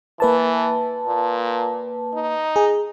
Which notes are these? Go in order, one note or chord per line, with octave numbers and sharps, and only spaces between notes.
E3 A#3 B4 A5
A#2
D#4
G#4